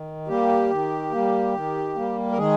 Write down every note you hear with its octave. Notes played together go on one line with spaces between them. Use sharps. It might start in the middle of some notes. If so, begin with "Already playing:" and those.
Already playing: D#3
G3 A#3 G4
D#3
G3 A#3
D#3
G3 A#3
A#4
D#3 G#3 G#4